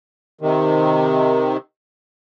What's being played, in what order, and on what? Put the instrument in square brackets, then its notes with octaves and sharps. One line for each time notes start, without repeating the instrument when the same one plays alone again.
[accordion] C3 D#3